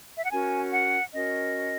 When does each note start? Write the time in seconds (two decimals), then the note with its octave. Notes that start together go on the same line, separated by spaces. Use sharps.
0.16 E5
0.24 F#5
0.31 C#4 F#4 A#4 G#5
0.72 F#5
1.13 C#4 F#4 A#4 D#5